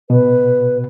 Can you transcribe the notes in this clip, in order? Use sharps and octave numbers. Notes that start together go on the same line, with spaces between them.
B2 B4